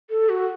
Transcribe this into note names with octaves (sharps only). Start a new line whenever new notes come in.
A4
F#4